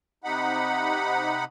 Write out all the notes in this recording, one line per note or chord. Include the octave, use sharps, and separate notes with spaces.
C3 D#4 F#5 B5